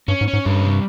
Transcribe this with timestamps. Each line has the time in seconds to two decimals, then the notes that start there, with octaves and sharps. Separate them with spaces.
0.08 G2 C#4
0.21 G#2
0.28 C#4
0.33 G#2
0.45 G2 G3
0.63 C3